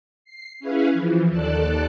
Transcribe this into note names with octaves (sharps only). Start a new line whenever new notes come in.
C7
C#4 E4 G#4 B4 F5
E3 F3
D#2 A4 D5 A5 F#6